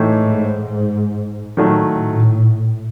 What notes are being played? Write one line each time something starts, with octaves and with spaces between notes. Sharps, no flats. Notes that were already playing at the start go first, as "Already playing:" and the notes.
Already playing: A2 E3 A3 D#4
G#2
A2 D#3 F#3 A3